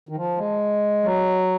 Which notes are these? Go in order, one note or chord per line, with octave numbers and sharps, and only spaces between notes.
D#3
F3
G#3
F#3